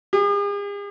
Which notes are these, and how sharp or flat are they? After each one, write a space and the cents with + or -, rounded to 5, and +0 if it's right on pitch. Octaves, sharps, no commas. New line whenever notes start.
G#4 -45